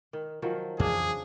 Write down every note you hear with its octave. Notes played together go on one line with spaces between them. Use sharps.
D#3
D#3 F3 F#3
F2 C#3 E3 F3 D4 G#4